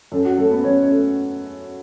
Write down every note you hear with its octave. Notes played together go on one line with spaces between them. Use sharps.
F#2 A4
F#4
F#3 A3 A4
B3 B4
F#2 C#4 C#5
C#4 C#5
A3